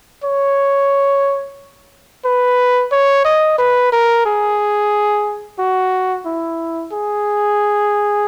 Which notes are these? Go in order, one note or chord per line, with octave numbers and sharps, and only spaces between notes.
C#5
B4
C#5
D#5
B4
A#4
G#4
F#4
E4
G#4